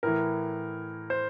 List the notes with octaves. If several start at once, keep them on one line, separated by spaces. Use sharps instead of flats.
A2 E3 A#4
C5